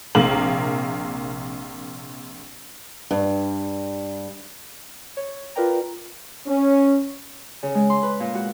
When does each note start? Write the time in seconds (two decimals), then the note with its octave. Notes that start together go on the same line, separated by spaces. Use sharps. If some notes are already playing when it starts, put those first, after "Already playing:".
0.15 A#1 C3 A#3 F#7
3.11 G2
5.17 C#5
5.55 F4 A#4 B4 D5 G5 A#5
6.47 C#4
7.63 C#3
7.75 G#3
7.90 C6
8.03 B4
8.20 A#2
8.35 F#4